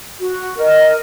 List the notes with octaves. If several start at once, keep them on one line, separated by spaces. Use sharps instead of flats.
F#4
A#4 D#5